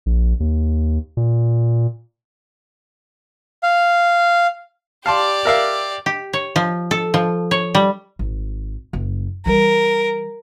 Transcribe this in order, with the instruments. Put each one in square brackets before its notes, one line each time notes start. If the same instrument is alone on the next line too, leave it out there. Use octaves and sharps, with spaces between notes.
[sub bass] A#1
D#2
A#2
[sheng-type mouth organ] F5
[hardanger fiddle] G4 D5 [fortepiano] F5 A5 C6
[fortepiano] A#4 E5 F5
[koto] G4
C#5
F3
A4
F3
C#5
G3
[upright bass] G#1
F#1
[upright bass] E3 G3 [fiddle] A#4